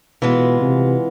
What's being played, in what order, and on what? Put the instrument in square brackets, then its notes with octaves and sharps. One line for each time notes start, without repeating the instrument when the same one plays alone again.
[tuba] B2 [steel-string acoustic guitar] E3 G#3 B3 F4
[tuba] C3